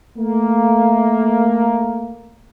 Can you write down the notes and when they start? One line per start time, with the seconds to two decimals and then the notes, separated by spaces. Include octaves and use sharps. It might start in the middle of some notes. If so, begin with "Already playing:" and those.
0.18 A3 A#3